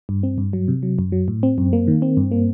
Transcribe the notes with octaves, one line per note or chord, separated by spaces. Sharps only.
G2
C4
G2
F#3
C3
F#3
F#2
F#3
A2
C4
F#2
A#3
D#3
C4
G2
A#3